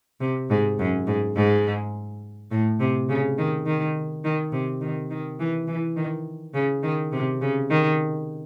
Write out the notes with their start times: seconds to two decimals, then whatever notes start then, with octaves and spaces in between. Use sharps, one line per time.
0.20 C3
0.50 G#2
0.79 F#2
1.07 G#2
1.35 G#2
2.51 A2
2.80 C3
3.09 C#3
3.38 D#3
3.66 D#3
4.24 D#3
4.52 C3
4.81 D#3
5.10 D#3
5.39 E3
5.67 E3
5.96 D#3
6.54 C#3
6.83 D#3
7.12 C3
7.41 C#3
7.70 D#3